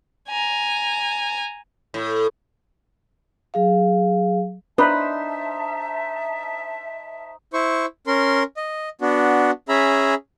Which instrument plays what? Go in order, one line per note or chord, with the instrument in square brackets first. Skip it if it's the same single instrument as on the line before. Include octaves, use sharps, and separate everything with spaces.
[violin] G#5 A#5
[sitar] A2
[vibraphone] F#3 G#4 F5
[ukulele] D4 [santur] D#4 C5 C6 [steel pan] B4 [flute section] E5 A5
[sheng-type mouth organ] E4 C5 C#6
C#4 A#4 C6
D#5
B3 D4 F#4
C#4 G#4 E5 A#5 B5